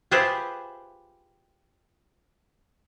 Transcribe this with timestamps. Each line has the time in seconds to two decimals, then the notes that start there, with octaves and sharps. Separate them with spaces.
0.11 F4 G4 G#4 B4 C5 E5